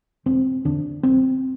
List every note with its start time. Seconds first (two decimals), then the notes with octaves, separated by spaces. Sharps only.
0.26 E1 C4
0.65 E2 D3 D4
1.03 B1 C4